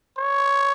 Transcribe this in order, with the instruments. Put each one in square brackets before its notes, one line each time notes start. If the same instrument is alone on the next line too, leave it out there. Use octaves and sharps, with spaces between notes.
[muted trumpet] C#5